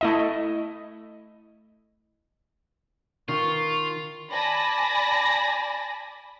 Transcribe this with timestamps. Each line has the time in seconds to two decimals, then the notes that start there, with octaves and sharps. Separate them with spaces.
0.01 A3 E4 D#5
3.28 D#3 F4 C#6
4.32 D5 G#5 A5 B5 A#6